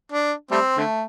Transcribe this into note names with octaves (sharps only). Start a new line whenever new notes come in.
D4
G3 A3 C4
D3 A3